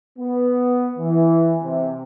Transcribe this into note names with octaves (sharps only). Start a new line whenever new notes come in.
B3
E3
C3